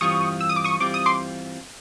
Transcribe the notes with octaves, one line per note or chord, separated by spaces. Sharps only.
G2 E3 G3 C4 F4 C#6 D#6
E6
D#6
D6
C#6 D#6
G2 E3 G3 C4 F4 D6
D#6
C6 D6